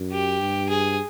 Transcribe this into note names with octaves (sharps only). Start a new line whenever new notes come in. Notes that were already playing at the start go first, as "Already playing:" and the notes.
Already playing: F#2
G4
G2
G#4